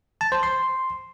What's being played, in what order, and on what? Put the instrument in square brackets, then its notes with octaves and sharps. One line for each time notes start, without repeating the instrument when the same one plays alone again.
[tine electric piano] A5
C5
C6